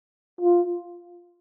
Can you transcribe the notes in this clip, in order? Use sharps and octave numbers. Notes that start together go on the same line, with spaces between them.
F4